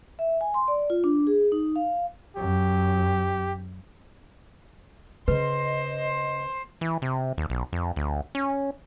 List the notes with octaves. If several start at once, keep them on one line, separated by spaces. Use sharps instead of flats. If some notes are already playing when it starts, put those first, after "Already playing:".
E5
G#5
C6
D5
F4
D4
G#4
D#4
F5
F#2 G4
C#3 B4 C5 D#5 C6
E3
C3
D#2
B1
F2
D2
C#4